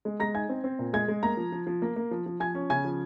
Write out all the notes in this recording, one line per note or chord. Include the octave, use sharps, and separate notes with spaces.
G#3
G#3 A#5 A#6
D#4 G#5 G#6
C4
C4
A#2
G#3 G#5 G#6
G#3
A#3 A#5 A#6
F3
F3
F3
A#3
A#3
F3
F3
F3 G#5 G#6
C#4
C#3 G#5 G#6
F3